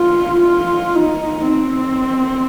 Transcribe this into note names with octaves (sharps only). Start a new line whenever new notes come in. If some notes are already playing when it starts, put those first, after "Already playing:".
Already playing: F4
F4
D#4
C4